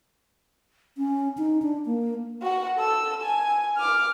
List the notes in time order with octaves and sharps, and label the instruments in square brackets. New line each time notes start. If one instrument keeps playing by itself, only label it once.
[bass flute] C#4
D#4
D4
A#3
[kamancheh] F#4 F#5
A4 E6
G#5
D6 F6